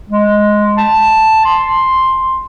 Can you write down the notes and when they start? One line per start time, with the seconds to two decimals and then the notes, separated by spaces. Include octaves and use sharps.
0.09 G#3
0.78 A5
1.45 C6